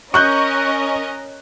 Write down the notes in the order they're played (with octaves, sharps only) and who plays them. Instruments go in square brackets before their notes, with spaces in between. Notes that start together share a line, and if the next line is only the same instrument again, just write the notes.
[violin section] C#4 A#4 D#5 [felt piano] C#6 F#6 G6